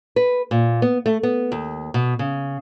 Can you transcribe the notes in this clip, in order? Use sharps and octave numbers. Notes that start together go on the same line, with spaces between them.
B4
A#2
B3
A3
B3
D#2
B2
C#3